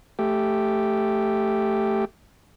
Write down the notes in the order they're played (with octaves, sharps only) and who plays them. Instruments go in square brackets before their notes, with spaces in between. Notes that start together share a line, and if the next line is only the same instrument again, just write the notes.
[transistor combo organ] A3 G4